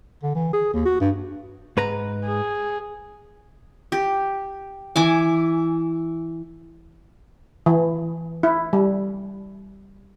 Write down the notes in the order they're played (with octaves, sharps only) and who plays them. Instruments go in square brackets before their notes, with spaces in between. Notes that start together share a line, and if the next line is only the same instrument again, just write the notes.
[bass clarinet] D3
E3
G#4
D#2
F#4
G2
[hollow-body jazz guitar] G#2 B4 A#5
[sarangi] G#4
[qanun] G4
E3 G#5 D6
[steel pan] E3
E4
G3